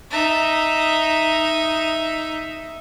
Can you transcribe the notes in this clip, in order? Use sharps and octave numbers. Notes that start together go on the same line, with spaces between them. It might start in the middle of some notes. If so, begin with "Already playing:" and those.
D#4 E5